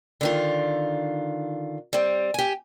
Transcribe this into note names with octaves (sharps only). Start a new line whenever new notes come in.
D3 D#3 F4
G3 C4
G4 G#5